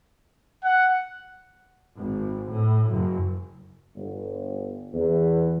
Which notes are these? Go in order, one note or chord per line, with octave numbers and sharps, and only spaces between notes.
F#5
G#1
A2
F#1
G1
E2